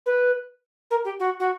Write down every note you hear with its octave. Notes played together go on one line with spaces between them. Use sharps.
B4
A#4
G4
F#4
F#4